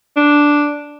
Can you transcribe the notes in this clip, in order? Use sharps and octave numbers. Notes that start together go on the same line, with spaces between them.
D4